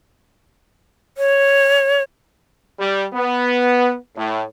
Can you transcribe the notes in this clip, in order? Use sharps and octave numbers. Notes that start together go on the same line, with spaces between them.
C#5
G3
B3
A2